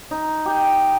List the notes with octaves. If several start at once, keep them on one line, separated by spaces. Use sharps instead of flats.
D#4
G4